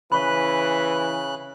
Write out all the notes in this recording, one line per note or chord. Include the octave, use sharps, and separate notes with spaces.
C#3 E3 B4 B5 C#6 F#6